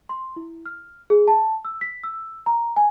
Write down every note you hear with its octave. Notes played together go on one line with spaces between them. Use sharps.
C6
E4
F6
G#4
A5
E6
B6
E6
A#5
G#5